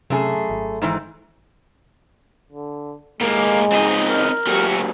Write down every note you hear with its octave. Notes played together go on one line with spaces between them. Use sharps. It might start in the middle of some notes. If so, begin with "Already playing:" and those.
F#2 C3 A3 G#4
G#1
G#2 D#3 E3
D3
D#2 A2 G#3 A#3
C#2 C4 D#4 D#5
A#4
F#2 A#2 A3 F#4 G4